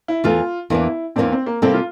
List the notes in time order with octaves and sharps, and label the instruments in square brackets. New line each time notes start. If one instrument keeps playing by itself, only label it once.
[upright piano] E4
[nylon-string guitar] E2 E3 A3 [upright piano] F4
[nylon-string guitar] E2 E3 A#3 D4 [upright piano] E4
[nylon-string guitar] E2 E3 A#3 D4 [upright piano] C4
[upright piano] C4
A#3
[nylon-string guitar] C3 G3 A#3 E4 A4 [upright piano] C4
[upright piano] F4